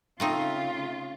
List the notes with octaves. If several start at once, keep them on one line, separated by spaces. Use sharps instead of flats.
C#3 A3 C4 D#4 F4 E5 F5